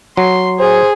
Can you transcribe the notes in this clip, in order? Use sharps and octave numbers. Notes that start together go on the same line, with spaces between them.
F#3 C6
G#4 C5